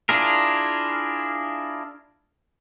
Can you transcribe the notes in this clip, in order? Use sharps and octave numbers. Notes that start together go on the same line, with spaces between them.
D4 E4 F4 G#4 A#4